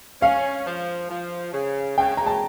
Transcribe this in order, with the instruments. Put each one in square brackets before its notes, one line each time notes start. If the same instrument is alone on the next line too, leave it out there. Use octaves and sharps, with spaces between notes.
[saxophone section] C#4 [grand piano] F5
[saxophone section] F3
F3
C#3
[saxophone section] C#3 [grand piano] G5
[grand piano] A#5
A5